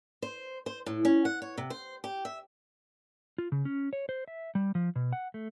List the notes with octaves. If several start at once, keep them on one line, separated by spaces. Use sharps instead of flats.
C5
C5
A2
C#4
F#5
C#5
C3
C5
G4
E5
F4
C#3
C#4
C#5
C5
E5
G3
F3
B2
F#5
A3